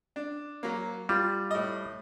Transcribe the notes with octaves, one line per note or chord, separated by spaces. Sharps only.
D4
F#3 A#3
G3 F4
A2 D#5